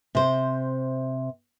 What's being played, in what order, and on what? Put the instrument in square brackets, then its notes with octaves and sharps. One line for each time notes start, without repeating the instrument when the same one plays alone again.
[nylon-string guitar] C3 C5